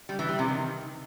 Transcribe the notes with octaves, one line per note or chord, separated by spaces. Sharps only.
G3
E3
G3
C3
D#3